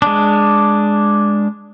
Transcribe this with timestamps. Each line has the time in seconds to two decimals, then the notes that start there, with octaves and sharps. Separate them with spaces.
0.02 G#3 D4